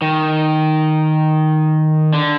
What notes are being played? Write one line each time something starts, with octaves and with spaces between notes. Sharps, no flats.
D#3
D3